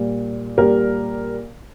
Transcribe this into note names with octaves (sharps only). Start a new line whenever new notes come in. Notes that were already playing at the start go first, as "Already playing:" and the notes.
Already playing: A#2 G3
A#2 G3 G4 A#4